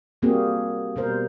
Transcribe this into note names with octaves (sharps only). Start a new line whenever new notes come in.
A#2 G3 A#3 C4 F#4 G#4
B2 G3 A#4 C5